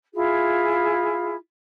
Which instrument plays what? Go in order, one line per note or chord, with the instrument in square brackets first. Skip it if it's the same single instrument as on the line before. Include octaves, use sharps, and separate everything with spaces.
[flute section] E4 F4 G#4